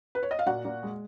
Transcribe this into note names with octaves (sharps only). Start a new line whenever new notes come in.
B4
C#5
D#5
F5
A#2 F#4 F#5
A#2
G#3